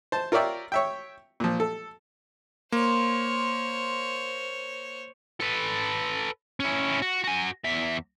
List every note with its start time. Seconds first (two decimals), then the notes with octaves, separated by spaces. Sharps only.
0.12 C5 A5
0.32 F4 A#4 C#5 D5 E5 G5
0.72 C#5 E5 G5
1.40 A#2 F3
1.60 A4
2.72 A#3 C5 C#5 C6
5.41 A4 B4
6.60 C#4 E4
7.02 F#4
7.24 F#4 G#5
7.64 E2 E5